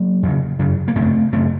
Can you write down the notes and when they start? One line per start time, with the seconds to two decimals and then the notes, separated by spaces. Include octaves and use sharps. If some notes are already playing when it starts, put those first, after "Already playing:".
Already playing: F#3 A#3
0.23 F2 C#3
0.59 F#2 C#3
0.88 A#3
0.95 F#2 C#3 A3 C4
1.32 F#2 C#3 A3 C4